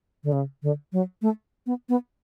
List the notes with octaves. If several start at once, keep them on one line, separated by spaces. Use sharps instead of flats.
D3
C#3
D3
F#3
A3
B3
B3